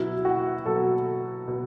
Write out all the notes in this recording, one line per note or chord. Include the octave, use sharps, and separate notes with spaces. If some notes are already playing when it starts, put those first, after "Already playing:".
Already playing: B2 F#3 E4
F#4
B2 F#3 A4
B2